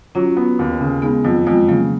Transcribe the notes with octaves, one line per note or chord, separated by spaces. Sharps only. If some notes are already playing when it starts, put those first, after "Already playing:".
F#3 C#4 F4
B3
D#2
C#3
G#3 B3 D#4
F2 D#3 F#3
F2 F3 G#3
C#3 F#3 A#3